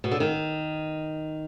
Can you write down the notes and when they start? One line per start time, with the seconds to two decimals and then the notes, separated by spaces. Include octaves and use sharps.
0.04 B2
0.12 D3
0.20 D#3